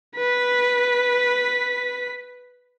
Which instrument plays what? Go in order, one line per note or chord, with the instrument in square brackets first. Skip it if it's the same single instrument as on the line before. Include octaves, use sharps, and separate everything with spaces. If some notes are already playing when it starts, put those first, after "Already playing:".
[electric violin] B4 B6